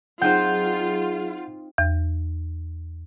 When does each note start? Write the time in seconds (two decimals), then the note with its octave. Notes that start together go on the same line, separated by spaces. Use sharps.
0.22 F#3 C4 D#4 F4 G#4 C5 F#5 G6
1.78 E2